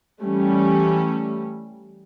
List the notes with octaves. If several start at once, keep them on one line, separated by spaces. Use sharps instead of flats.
E3 G3 A3 C#4